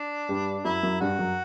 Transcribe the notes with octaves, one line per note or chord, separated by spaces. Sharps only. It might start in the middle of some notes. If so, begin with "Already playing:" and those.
Already playing: D4
G2 G3
F#2 F#3 E4
F#2 F#3
G2 G3 F#4
F#2 F#3